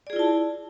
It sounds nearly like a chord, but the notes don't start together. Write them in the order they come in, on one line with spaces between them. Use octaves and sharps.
D5 G#4 F4 E4 A5